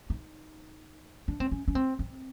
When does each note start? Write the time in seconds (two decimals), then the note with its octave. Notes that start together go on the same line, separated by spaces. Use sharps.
0.10 D#4
1.28 D4
1.40 C4
1.51 C#4
1.68 C#4
1.75 C4
1.99 C4